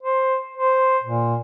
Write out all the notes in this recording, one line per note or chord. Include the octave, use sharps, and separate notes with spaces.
C5
C5
A#2